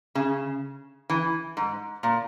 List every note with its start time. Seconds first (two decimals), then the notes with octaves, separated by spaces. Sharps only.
0.15 C#3
1.10 E3
1.57 G#2
2.03 A#2